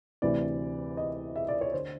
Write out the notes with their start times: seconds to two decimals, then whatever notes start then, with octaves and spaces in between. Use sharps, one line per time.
0.22 D2 C3 E3 D5
0.97 D#5
1.36 E5
1.48 D5
1.61 C#5
1.73 D3 C5